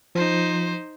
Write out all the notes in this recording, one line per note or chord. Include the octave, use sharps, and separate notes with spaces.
F3 D#4 C5